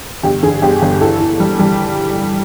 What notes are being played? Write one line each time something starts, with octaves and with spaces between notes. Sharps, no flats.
G1 G4
D3 G#4
G1 G4
G1
E3 A4
E3
G3
G3